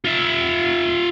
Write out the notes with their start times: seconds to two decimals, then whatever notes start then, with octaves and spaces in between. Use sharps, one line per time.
0.05 F4 E5